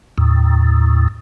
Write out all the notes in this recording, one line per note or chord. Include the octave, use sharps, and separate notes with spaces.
D#2 A2